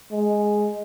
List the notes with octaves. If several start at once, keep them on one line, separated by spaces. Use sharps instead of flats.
G#3